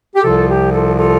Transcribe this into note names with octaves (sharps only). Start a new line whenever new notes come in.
G4
C2 C3 F3 F4 A4
G4
F4 A4
F4 A4